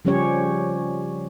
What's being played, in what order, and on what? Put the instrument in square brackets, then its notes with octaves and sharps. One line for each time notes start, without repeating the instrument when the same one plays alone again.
[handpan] C#3 F3 G3 C#4 G4 C#5